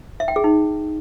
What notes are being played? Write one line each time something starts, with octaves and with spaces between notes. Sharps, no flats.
E5
G5
G#4
D#4